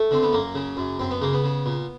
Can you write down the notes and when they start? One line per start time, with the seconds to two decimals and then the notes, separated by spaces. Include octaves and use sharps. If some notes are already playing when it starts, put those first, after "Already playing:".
Already playing: A3
0.11 D3 C4
0.23 B3
0.33 F#2 A#3
0.55 C#3
0.77 F#2
0.99 F#2 C4
1.11 B3
1.21 C#3 A#3
1.33 B3
1.44 C#3
1.66 A#2